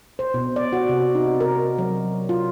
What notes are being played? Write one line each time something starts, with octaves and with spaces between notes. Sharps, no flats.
C5
B2
D5
F#4
C3
D#4
A#4
F#3
F4